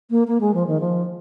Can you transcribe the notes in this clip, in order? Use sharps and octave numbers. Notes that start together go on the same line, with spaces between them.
A#3
A#3
G#3
F3
D#3
F3